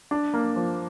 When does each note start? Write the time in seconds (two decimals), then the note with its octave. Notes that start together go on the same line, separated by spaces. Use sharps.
0.11 D4
0.34 A#3
0.56 F3